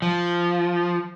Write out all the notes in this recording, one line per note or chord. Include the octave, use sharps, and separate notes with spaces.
F3